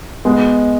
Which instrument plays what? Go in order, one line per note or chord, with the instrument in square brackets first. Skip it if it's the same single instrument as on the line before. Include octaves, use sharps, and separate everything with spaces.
[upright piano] G#3 [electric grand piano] B3